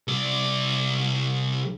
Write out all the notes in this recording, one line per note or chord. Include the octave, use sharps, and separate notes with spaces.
C2 D5